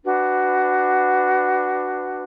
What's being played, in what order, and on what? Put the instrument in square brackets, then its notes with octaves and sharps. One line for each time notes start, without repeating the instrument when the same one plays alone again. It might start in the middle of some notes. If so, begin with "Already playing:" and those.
[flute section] D4 F#4 B4